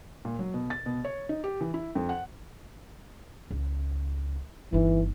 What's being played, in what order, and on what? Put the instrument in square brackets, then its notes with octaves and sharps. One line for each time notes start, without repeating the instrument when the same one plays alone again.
[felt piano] A#2
F#3
B2
A6
B2
C#5
D#4
G4
E3
E4
F2
F#5
[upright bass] C#2
[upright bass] G1 D#4 [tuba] E3